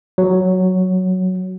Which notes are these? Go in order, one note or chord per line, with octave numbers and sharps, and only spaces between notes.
F#3